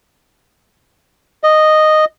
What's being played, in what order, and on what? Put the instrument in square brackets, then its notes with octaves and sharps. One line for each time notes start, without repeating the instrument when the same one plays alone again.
[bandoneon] D#5